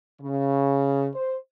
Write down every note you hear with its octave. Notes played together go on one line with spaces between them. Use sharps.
C#3
C5